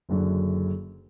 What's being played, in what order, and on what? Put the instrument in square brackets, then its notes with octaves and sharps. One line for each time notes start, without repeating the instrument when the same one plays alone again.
[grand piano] F#1 F#2 D3 F#3